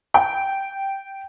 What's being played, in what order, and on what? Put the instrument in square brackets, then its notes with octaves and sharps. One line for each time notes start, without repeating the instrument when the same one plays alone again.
[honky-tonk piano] G5